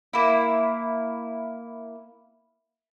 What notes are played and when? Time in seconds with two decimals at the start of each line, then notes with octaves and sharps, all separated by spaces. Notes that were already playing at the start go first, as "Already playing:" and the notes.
0.13 A#3 E4